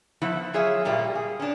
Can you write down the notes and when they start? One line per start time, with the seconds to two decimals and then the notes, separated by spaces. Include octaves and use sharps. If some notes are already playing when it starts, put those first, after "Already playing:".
0.22 F3 B3 E4
0.53 F#3 F4 G#4 C#5 E5
0.85 G2 A#2 G3 A#3 G4
1.15 G#4
1.40 C#4 D4